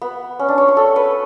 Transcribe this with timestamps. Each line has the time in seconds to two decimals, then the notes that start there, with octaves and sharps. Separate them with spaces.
0.02 B3
0.39 C#4
0.49 D4
0.58 C#5
0.68 C#5
0.77 A4
0.96 B4